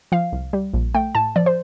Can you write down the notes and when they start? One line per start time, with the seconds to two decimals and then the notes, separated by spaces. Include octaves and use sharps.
0.12 F3 F5
0.32 C2
0.53 G3
0.74 A#1
0.95 A3 G5
1.15 A2 A5
1.36 F3 D5
1.46 C5